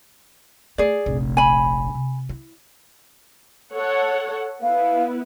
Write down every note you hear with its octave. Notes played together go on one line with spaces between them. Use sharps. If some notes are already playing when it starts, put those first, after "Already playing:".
A3 G#4 D5
F1 A#1
G#5 B5
C3
E4
A4 C#5 F#5
B3 E4 B4 F5